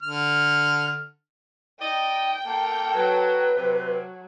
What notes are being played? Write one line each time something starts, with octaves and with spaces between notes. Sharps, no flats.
D3 F6
D#4 D5 D#5 G5
A#3 A4
F#3 B4
C3 F#3